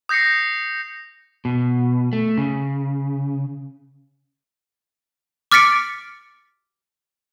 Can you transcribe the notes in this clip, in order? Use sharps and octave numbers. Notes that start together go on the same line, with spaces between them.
D#6 G6 A#6 C7 C#7
B2
A3
C#3
D6 F6 A6 B6 C#7 D7